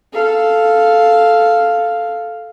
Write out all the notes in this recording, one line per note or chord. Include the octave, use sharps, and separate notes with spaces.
A4 F5